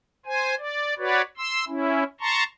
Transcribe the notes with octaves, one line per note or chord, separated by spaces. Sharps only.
C5 G#5
D5
F#4 B4 C#5 D5
C6 E6
C#4 E4
A5 A#5 C6 C#6